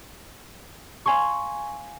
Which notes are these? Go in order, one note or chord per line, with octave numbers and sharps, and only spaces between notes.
F5 G#5 C6 C#6